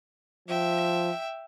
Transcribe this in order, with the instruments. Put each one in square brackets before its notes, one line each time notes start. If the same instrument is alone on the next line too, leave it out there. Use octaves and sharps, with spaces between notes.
[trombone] F3 [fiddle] E5 G5